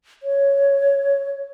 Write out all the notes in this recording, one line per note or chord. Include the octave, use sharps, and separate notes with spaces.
C#5